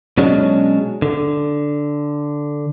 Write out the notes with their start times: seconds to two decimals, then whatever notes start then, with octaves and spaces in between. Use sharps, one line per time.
0.18 B2 F#3 G#3 C#4 D4
1.02 D3